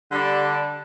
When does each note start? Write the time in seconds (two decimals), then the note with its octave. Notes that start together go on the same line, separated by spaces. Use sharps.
0.10 D3 G3 D4